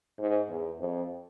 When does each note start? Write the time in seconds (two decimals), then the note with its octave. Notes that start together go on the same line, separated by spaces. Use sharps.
0.19 G#2
0.48 E2
0.79 F2